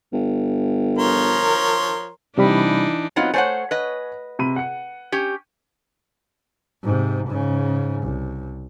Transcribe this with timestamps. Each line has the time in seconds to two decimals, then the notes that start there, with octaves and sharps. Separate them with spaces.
0.13 G1
0.98 F3 A#4 C#5 C6
2.38 C3 E3 G3 D4 D#4 B5
3.16 F#3 B3 C4 D#4 F4
3.34 A3 C5 C#5 F#5 G#5
3.71 B4 D#5
4.39 C3 B5 D#7
4.56 F#5 C#7
5.12 C#4 G4
6.83 G#2 C3
7.28 G#2 C#3
8.03 C2